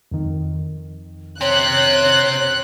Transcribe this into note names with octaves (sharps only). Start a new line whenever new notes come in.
F2 D#3
C3 C4 C#5 F#6